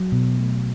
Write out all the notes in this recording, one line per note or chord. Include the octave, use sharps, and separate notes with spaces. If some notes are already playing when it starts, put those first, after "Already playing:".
Already playing: F#3
B2
A3